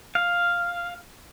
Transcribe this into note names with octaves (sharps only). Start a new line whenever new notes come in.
F5